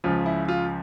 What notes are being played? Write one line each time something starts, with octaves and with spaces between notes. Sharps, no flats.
C#2 C#3 F3 F4
E4
F4